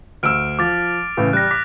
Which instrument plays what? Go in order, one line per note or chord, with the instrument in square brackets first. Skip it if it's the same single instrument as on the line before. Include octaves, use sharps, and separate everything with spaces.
[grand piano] D2 E6 [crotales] F6 D7
[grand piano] F3 [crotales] D6 A6
[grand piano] A2 C#3 E3
[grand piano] G3 [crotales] F#6 A#6
[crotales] D6 [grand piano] B6